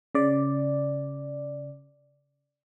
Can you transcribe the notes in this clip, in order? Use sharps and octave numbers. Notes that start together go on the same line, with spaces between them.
C#3 D5